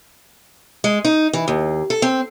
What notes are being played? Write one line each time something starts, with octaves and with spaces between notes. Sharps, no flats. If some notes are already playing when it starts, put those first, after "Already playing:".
G#3
D#4
E3
D#2
A4
C4